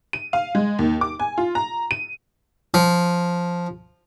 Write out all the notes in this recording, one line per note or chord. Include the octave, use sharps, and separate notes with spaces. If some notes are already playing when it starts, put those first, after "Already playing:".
D#7
F5
G#3
D#2
D6
G#5
F4
A#5
D#7
F3